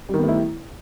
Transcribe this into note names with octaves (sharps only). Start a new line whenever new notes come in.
D#3 G3 A3 B3 E4